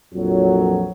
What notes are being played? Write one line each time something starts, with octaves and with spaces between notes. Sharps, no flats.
A#1 F2 F#3